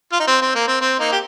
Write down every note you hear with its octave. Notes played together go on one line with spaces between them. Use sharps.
F4
D#4
C4
C4
A#3
C4
C4
A#3 D#4
G4